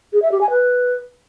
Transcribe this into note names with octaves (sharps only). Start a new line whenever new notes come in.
G#4
E5
G4
G#5
B4